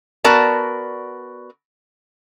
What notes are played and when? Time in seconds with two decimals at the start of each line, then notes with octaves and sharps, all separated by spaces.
0.24 B3 F#4 A#4 D5 A5